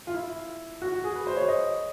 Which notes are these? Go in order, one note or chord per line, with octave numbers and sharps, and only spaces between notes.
F4
E4
F#4
F#4
G#4
B4
C5
C#5
D#5